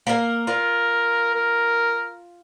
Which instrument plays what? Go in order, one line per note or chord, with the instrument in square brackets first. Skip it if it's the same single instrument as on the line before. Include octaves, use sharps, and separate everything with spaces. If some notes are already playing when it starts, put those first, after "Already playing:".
[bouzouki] A#3 A#4
[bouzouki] F4 [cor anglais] A#4
[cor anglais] A#4